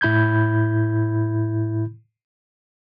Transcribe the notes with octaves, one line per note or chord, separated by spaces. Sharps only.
A2 E4 B5 G6 G#6